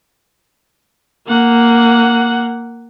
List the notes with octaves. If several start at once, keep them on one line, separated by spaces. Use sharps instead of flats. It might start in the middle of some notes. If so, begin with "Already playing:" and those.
A#3 F#5